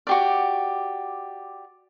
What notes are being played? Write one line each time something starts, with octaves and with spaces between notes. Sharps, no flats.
F#4 G4 D5